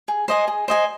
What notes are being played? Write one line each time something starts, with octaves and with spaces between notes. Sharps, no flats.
G#4
C5 D#5 G#5
G#4
C5 D#5 G#5